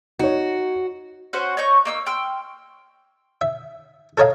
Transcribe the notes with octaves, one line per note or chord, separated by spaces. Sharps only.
D#4 F#4 C#5
C#4 F#4 C5 F#5
C#5 D#5 C#6 G6
A#3 D#4 E6
G5 C6 E6 F6
E5
A4 A#4 C#5 D#5 F5